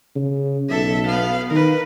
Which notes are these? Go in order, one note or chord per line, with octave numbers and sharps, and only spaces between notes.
C#3
B1 A4 E5
B3 F5
D#3 A#4 B4